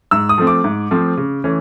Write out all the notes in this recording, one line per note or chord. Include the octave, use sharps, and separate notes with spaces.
G#2 E6
D#6
F3 A3 C4
D6
G#2
F3 A3 C4
C#3
E3 A3 C#4